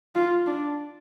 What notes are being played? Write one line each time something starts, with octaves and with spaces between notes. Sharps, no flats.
F4
D4